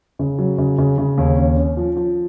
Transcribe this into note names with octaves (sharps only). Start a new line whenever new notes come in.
C#3
F#3
C#3
C#3
C#3
D#2
C#4
C#4
F3
F3